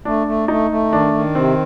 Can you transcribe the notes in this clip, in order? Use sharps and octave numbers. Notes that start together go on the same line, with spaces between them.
A3 D4
A3
A3 D#4
A3
D#3 D4
D#3
C3 C4